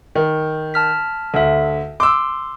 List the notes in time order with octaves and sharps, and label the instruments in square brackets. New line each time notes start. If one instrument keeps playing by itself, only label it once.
[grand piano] D#3
[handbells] A5 F6 B6
[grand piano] D2 [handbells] A4 E5
[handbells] C6 [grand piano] D6 E6